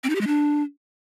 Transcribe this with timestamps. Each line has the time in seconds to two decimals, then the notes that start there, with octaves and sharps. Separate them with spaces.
0.04 C4
0.10 D#4
0.15 G4
0.21 G#3
0.27 D4